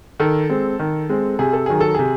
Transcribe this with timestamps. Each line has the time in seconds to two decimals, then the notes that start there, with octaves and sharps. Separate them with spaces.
0.20 D#3 A4
0.50 G#3 C4
0.79 D#3
1.09 G#3 C4
1.39 C3 G#4
1.53 A4
1.66 D#3 F#3 G#4
1.80 A4
1.95 C3 G#4